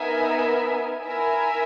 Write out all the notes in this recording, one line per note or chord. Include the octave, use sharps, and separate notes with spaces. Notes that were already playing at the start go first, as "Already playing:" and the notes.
Already playing: B3 D#4 A#4 E5 G#5
E4 A#4 E5 G#5